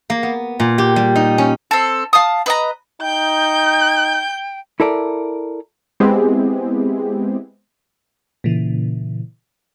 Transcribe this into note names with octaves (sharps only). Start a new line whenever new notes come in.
A#3
B3
A#2
G4
G3
D#4
C#4
C4 A4
F5 A5 D#6
B4 D#5 A#5
D#4 G5 G6
E4 A4 A#4 D5
G#3 B3 C4 E4 G4 G#4
A#2 C#3 E3